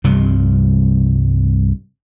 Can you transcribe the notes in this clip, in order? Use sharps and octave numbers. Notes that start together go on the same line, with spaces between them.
C2 G2 C3 F3